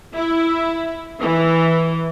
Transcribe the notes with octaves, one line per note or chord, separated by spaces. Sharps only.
E4
E3